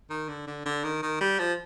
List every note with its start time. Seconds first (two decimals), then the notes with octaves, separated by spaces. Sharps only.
0.10 D#3
0.28 D3
0.47 D3
0.66 D3
0.84 D#3
1.02 D#3
1.21 G3
1.39 F3